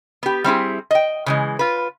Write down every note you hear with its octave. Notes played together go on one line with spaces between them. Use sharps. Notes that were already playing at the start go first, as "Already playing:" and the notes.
B3 G4
G3 C4 E4 G#4
D#5 G5
C#3 E3 G#3
F4 B4